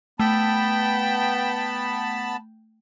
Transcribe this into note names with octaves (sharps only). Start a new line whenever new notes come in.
A3 B3 G5 A5 B5